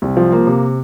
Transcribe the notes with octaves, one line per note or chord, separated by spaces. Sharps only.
C2
F3
A#3
C3